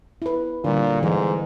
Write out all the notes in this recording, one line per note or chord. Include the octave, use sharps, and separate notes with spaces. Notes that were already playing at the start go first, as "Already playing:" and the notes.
E4 B4
A#2 D3 G3
G#2 E3